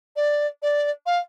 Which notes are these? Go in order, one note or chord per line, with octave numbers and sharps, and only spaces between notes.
D5
D5
F5